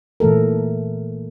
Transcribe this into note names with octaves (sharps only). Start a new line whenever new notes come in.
A#2 E3 A3 A4 A#4